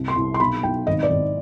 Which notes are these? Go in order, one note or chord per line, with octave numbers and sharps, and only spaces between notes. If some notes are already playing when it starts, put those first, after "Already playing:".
Already playing: C2
C6
C2
C6
B1 B5
B1 G5
G#1 D#5
D5
G#1